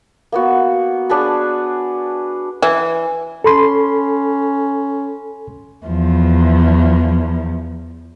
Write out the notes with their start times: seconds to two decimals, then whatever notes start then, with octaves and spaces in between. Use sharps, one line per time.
0.32 A#3 B3 F#4
1.09 D4 G#4 B4 A5
2.62 E3
3.44 C#4 A4 B5 C6
5.86 E2 F3